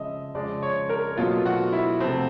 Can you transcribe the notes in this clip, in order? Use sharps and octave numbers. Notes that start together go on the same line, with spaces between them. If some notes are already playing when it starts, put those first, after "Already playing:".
Already playing: C#3 F3 G#3 D#5 E5
C#3 F3 G#3 D5
C#5
A#4
B2 F#3 A3 F4
F#4
E4
C3 F3 A3 C4